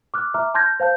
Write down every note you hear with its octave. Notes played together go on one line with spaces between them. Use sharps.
D6 F6 F#6
E5 A#5 D6 F6
A5 C6 F6 G6 G#6 A#6
C5 F5 A5 G6